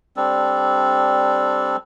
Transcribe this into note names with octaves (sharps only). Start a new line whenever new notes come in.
G3 C4 D4 A4